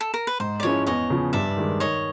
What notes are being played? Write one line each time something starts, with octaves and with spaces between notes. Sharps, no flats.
A4
A#4
B4
G#2 C5
D5
F3 G#3 C#4 E4 C#5
E2 C#5 D#5
C#3 F3
G2 D5 E5
D#3 G#3
D#3 C#5 D#5